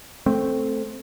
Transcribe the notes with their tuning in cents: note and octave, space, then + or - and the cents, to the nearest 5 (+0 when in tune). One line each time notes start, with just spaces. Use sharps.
A3 +0 C4 +0